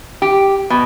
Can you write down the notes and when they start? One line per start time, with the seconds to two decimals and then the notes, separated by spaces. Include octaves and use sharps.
0.22 G4
0.70 B2